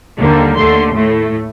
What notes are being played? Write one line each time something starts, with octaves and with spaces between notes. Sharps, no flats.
D#2 D3 G3 A#3
D#2 D3 A3 C6
A2 A3